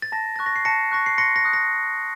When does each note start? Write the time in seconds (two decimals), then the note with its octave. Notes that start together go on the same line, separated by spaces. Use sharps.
0.02 A6
0.12 A5 A#6
0.36 C#6 F#6 A6
0.46 A#6
0.56 C7
0.65 A5 A#6 C#7
0.92 C#6 F#6 A#6
1.06 C7
1.18 C6 A#6 C#7
1.36 A#6
1.45 D#6 F#6
1.53 A#6